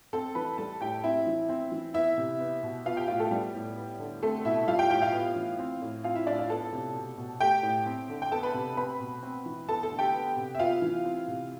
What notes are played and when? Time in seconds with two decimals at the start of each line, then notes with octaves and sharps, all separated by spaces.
0.13 C4 A4 A5
0.35 E3 B4 B5
0.58 G3 A4 A5
0.81 A2 G4 G5
1.04 C4 E4 E5
1.27 E3
1.49 C4
1.72 E3
1.94 B3 E4 E5
2.18 C3
2.40 B3
2.63 B2
2.86 B3 F4 F5
2.97 G4 G5
3.08 A2 F4 F5
3.19 A3 A4
3.31 G3 B3 G4
3.54 A2
3.76 B3
3.99 D3
4.22 A3 C4 A4
4.45 B2 E4 E5
4.68 G3 F4 F5
4.79 G4 G5
4.90 A2 G4 G5
5.02 F4 F5
5.13 B3
5.36 E3
5.59 C4
5.82 A2
6.04 C4 F4 F5
6.16 E4 E5
6.27 A2 D4 D5
6.38 F4 F5
6.50 B3 A4 A5
6.73 C3
6.95 B2
7.18 B2
7.41 A3 G4 G5
7.63 A2
7.86 C4
8.09 D3
8.22 G5
8.32 B3 A4 A5
8.43 B4 B5
8.54 C3
8.77 C4 B4 B5
9.00 B2
9.23 C4
9.46 E3
9.69 B3 A4 A5
9.83 A4 A5
9.91 D3
9.99 G4 G5
10.14 B3
10.37 C3
10.55 E5
10.59 B3 F4 F5
10.82 E3
11.05 C4
11.28 C3